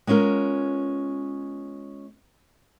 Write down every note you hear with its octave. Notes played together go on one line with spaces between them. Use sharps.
G#3 B3 C#4 F4 A#4